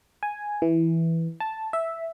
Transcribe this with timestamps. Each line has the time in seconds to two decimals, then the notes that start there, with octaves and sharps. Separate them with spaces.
0.23 G#5
0.62 E3
1.40 A5
1.73 E5